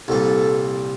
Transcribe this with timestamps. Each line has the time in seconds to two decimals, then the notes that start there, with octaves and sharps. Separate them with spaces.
0.08 C2 A#2 A4